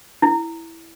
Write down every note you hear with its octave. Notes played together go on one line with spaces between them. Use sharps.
E4